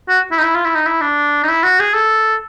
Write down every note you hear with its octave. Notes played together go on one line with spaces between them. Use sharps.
F#4
E4
D#4
E4
F4
E4
D#4
E4
D4
D#4
E4
F#4
G#4
A4